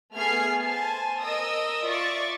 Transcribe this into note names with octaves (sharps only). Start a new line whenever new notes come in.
A3 B3 G#4 F6 G#6 C7
C5 G#5 A5
A#4 D#5 D#6 E6
F4 D5 E5 C#6 A6